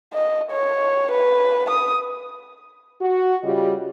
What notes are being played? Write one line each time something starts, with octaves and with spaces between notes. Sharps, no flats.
D#5
C#5
B4
D#6
F#4
C#3 G3 F4 G4 D#5